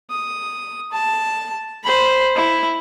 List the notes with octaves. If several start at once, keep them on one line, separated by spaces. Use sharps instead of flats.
D#6
A5
C5 B5
E4